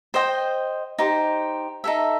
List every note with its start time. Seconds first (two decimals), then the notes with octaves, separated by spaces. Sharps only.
0.14 C5 D#5 G5
0.99 D#4 G4 C5
1.84 D#4 A4 E5